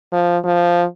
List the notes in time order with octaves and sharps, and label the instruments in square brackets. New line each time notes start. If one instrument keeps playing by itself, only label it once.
[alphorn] F3
F3